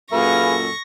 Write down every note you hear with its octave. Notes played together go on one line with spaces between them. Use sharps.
F#2 A#2 G#4 A4 B4 F5 C#6 A#6